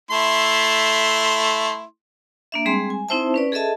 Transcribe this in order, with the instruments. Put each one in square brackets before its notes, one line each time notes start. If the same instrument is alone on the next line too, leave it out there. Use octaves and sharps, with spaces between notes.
[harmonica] A3 E4 C6
[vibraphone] A#3 D4 E5
G3 G#3 C4 G#4 C6
G#5
C4 D#4 E4 C5 E5 A5
C#4 B4 D5
G#4 A4 D#5 E5 A5